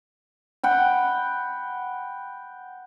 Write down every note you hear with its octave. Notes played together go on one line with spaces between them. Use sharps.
F#5 G5 B5